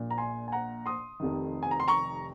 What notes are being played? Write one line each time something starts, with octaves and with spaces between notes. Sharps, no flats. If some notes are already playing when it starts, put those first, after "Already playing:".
Already playing: A#1 A#2
A#5
G#5 C6
G#5
F#5 A#5
C6 D#6
F1 F2 C3 D#3
G#5
A#5
C6
A#5 C#6